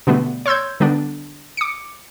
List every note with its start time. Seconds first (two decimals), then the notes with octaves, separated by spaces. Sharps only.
0.07 B2 D3 G3 A3 B3
0.46 C#5 C6 E6 G6 G#6
0.80 D3 G3 B3 D4
1.57 D6 C#7